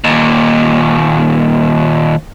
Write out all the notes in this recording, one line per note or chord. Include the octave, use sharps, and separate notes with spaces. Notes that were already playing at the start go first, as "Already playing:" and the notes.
D#2 A#2